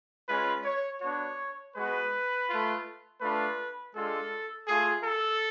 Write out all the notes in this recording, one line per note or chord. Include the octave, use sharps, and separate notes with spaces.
G#3 C#4 F4 B4
C#5
B3 D4 F#4 C#5
G#3 B3 F#4 B4
A3 F4
A3 D4 F4 B4
G#3 D4 F4 A4
A3 F4 G#4
A4